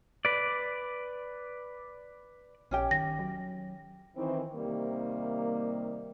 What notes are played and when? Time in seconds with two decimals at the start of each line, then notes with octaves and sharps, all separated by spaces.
0.25 B4 D5
2.71 A#1 C#4 G4 G5
2.91 D#3 A#6
3.19 F#3
4.16 D#3 E3 C4
4.55 C3 D#3 G3 A#3